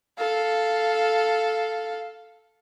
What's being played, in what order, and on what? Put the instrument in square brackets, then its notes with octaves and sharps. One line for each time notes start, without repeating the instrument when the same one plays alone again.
[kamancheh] A4 F5